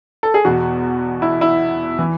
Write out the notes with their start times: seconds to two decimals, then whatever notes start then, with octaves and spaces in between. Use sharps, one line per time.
0.23 A4
0.34 G#4
0.45 E2 B2 F#4
1.22 E4
1.41 E4
1.99 E3